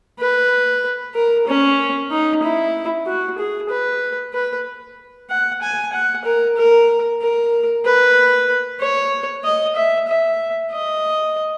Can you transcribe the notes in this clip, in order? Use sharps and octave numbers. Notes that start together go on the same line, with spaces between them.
B4
A#4
C#4
D#4
E4
F#4
G#4
B4
B4
F#5
G#5
F#5
A#4
A#4
A#4
B4
C#5
D#5
E5
E5
D#5